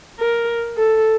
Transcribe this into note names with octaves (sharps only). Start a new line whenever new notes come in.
A#4
A4